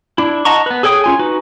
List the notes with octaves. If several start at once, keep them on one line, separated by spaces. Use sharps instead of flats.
D4 E4
D#5 F#5 A5 A#5 C#6
B3 B4
G#4 A4 C#5 G5 D#6
C#4 F4 G#5
D#4 F#4 B4